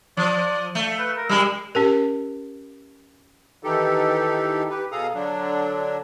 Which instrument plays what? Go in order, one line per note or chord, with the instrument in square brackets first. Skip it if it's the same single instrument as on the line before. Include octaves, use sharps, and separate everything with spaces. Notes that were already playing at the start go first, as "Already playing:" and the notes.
[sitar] F3 [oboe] D5
[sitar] A3
[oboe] B4
A#4
[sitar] G3 G#3 A#4 [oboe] E6
[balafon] C#4 G4 A#4
[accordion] D#3 E3 D#4 G4 A4
G4 B4
B2 G#4 A4 F5 A#5 D#6
D3 F#3 D4